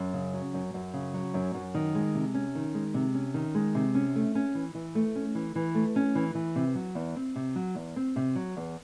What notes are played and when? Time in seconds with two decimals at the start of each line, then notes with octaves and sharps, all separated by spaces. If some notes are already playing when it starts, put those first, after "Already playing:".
Already playing: F#2
0.13 C#3
0.34 F#3
0.54 F#2
0.74 F#2
0.94 C#3
1.14 F#3
1.34 F#2
1.54 F#2
1.74 D#3
1.95 G#3
2.15 C3
2.34 C#4
2.55 D#3
2.74 G#3
2.94 C3
3.14 C#4
3.34 D#3
3.55 G#3
3.75 C3
3.95 C#4
4.15 A3
4.35 C#4
4.55 E3
4.75 E3
4.95 A3
5.15 C#4
5.35 E3
5.55 E3
5.75 A3
5.96 C#4
6.15 E3
6.35 E3
6.56 C3
6.75 F#3
6.95 E2
7.16 C4
7.36 C3
7.56 F#3
7.75 E2
7.96 C4
8.16 C3
8.35 F#3
8.57 E2